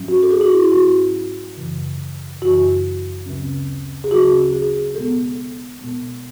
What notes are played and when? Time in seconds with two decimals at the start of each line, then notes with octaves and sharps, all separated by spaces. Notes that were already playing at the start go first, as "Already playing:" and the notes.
Already playing: G#2 F#3 C#4
0.08 F#4
0.23 A4
0.31 G#4
0.41 F#4
0.51 E4
0.72 G#2 F#3 C#4 F#4
1.57 F#2 C#3 E3
2.42 F#2 C#3 E3 F#4
3.26 D2 C#3 F#3 C#4
4.04 G#4
4.11 D2 C#3 F#3 C#4 F#4
4.53 G#4
4.95 B2 G#3 B3 A4
5.79 B2 G#3 B3